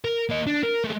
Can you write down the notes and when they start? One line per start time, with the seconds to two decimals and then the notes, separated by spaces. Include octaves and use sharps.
0.05 A#4
0.30 A#3 D#5
0.47 D4
0.63 A#4
0.84 G#3 A3